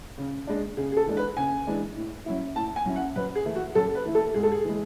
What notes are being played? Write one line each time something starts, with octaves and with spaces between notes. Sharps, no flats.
C#3
G#3 D4
C#3 G#4
G#4
A4
E3 G#3 D4
B4
C#3 G#5
E3 G#3 D4
A2
F#3 C#4 E4
A2 A5
G#5
F#3 C#4 E4
F#5
F#2 B4
G#4
E3 A3 E4
F#4
F#2 A4
B4
E3 A3 E4
A4
G#2 G#4
A4
G#4
E3 G#3